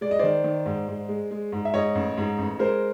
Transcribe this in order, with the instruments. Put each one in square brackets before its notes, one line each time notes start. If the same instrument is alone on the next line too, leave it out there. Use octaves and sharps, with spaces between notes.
[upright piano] G#3 D5
D#5
D#3 C5 D5
D#3
G#2
G#2
G#3
G#3
G#2
E5
G#2 C#5 D#5
A1
G#2
A1
G#3 A#4 C5